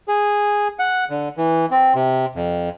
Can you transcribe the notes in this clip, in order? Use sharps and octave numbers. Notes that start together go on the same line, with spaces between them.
G#4
F#5
D3
E3
C4
C3
F2